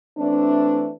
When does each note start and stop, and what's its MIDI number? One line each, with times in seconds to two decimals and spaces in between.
0.17 0.90 52
0.17 0.90 57
0.17 0.90 60
0.17 0.90 62